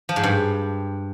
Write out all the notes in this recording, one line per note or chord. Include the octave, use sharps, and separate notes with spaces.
F3
G#2
G2